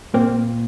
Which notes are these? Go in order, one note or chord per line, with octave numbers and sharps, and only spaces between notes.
A#2 A#3 C4